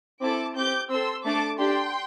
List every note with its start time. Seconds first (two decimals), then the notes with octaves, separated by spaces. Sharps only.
0.21 C4 E4 A4 A5 D6
0.56 C4 G4 D6 G6
0.90 C4 A4 C6 E6
1.25 A3 D4 A4 A5 D6
1.59 D4 G4 G5 C6